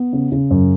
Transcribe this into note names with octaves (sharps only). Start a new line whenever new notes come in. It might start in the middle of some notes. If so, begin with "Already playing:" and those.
Already playing: B3
C#3
C#3
F#2